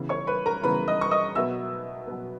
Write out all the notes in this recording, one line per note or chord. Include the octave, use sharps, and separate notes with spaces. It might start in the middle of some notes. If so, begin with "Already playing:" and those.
Already playing: C#3 E3 B3
C#5 C#6
B4 B5
A#4 A#5
C#3 E3 B3 B4 B5
D#5 D#6
C#6
D#5 D#6
B2 F#3 B3 E5 E6
B2 F#3 B3